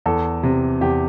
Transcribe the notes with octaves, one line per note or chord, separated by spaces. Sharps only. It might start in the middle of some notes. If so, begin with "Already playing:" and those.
E2 A4
C3
E2 G4